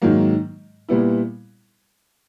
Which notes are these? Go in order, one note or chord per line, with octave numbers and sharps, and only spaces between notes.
G#2 D#3 F#3 A#3
A#2 G3 B3 E4